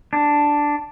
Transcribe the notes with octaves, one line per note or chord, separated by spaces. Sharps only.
D4